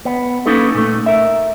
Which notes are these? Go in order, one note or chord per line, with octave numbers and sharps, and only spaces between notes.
B3
A#3 C#4 D#4 A4 B4
A#2 A3
A#4 E5